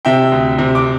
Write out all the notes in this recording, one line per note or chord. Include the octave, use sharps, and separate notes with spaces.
C3 E5 G5
D2
C3
D6